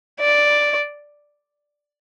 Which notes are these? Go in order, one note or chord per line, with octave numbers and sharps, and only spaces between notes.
D5